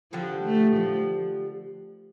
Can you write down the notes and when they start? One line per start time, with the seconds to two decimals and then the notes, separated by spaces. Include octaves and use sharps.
0.13 D3 F3 G3 D4 G4
0.45 A3
0.76 F3